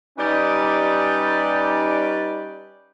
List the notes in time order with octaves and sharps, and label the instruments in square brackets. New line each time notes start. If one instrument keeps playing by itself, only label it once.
[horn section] G3 C#4 D#4 G4 B4 D5